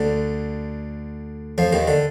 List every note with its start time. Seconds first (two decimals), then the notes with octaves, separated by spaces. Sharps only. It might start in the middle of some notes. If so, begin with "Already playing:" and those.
Already playing: D2 D3
1.58 F2 F3
1.72 D#2 D#3
1.87 D3